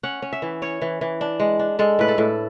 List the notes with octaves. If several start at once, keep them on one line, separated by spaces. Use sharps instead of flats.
C#4 F#5
C#4
E5
E3
C#4 C#5
E3
E3
D4
G#3
D4
G#3 A4
A2 B4
A4
A2